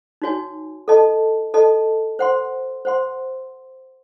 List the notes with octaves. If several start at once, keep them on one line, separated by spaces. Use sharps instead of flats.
D#4 F#4 C#5 G#5
A4 D#5 A5
A4 D#5 A5
C5 F#5 C6
C5 F#5 C6